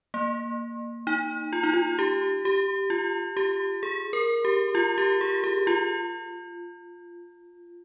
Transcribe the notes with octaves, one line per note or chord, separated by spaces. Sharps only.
A#3
D#4
F4
D#4
F4
G4
G4
F4
G4
G#4
A#4
G4
F4
G4
G#4
G4
F4